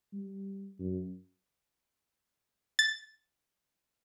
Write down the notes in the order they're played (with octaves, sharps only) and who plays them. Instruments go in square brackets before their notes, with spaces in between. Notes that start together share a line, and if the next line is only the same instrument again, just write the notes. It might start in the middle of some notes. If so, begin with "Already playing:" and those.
[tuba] G3
F#2
[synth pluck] A6